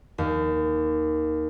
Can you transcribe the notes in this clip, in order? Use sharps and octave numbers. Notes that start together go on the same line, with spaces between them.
D#2